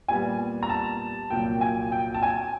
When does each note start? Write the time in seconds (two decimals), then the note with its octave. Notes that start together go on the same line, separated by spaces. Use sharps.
0.08 A#2 G3 B3 G#5
0.63 A#5
0.69 A5
1.30 C2 A#2 F#3 A#3 G5
1.61 G#5
1.92 G5
2.14 A5
2.22 G#5